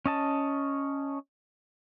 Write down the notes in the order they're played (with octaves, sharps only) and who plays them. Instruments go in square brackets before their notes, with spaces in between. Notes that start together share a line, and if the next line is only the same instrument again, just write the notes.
[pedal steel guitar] C#4 D#5 A5